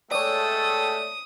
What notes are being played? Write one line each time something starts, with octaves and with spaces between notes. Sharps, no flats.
G#3 A3 A4 C#5 D5 G5 D#6 E6